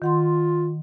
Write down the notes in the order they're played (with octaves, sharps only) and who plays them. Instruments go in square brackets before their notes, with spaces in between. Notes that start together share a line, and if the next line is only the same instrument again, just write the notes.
[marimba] D#3 F#5 C6 [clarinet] F4